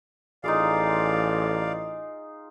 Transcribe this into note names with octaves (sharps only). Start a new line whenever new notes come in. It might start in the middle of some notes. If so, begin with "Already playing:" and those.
A1 D#4 F4 G#4 D5 F5